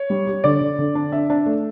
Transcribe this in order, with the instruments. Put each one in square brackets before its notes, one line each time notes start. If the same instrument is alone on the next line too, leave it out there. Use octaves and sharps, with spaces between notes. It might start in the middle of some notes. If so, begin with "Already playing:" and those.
Already playing: [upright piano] C#5
[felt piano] G3
G4
[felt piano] D3 [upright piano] D5
[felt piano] D3
D3
D4
[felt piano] D4 [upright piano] E5
[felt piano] D4
A3